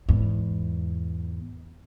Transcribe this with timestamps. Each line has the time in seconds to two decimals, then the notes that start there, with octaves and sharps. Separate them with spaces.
0.09 E2 G#2